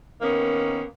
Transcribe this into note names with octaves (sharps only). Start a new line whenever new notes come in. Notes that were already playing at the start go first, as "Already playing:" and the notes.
D#3 A#3 B3 C#4